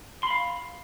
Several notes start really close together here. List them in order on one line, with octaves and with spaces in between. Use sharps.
C6 B5 F5